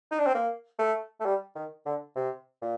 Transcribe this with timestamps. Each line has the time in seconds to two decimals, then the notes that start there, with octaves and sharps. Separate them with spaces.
0.11 D#4
0.19 D4
0.26 C4
0.34 A#3
0.79 A3
1.20 A3
1.25 G3
1.55 D#3
1.86 D3
2.16 C3
2.62 A#2